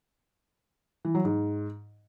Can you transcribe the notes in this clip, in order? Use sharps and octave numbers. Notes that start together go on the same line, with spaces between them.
E3
F#3
G#2